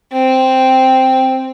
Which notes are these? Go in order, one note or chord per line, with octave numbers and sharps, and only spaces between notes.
C4